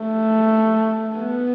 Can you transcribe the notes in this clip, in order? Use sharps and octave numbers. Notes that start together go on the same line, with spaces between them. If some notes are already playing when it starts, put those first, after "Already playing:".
Already playing: A3
B3